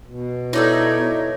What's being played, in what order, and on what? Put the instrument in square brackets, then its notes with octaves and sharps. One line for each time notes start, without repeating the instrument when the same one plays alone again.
[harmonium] B2
[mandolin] D#4 D5 E5 [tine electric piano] E4 A4 [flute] C#5